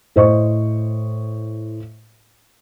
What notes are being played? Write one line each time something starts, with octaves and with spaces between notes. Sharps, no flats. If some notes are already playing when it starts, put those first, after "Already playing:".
A2 C5 D#5 C#6